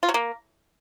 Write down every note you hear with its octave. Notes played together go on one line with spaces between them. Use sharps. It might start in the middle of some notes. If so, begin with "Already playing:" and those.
F4
F#3
A#3